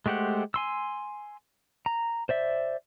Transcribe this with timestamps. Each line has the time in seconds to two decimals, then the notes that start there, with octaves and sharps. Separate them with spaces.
0.06 G#3 A3 G4 C5 F#5
0.54 G#5 C6 E6
1.86 A#5
2.29 C5 D5 E5